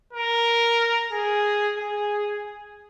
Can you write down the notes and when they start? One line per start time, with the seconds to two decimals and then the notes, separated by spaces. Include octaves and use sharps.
0.13 A#4
1.12 G#4
1.77 G#4